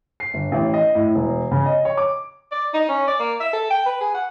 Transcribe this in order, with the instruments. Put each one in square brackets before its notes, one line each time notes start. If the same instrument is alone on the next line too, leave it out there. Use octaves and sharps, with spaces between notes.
[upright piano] C7
G1
A1
D#5
A2
E1
C#3
D#5
C#5
D6
[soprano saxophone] D5
D#4
C#4
D5
A#3
E5
A4
G5
B4
G#4
F#5